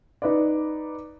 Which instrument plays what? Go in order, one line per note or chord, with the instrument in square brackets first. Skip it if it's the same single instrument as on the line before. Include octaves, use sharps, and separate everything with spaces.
[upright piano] D#4 B4 D5